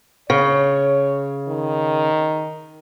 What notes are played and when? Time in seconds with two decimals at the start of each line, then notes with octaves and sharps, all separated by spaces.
0.30 C#3 C#5
1.48 D#3